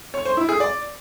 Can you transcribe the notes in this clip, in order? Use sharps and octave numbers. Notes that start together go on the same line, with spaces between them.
C#5
C5
E4
G#4
D5